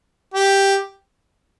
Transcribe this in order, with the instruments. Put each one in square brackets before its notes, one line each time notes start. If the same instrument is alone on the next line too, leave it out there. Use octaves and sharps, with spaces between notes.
[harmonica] G4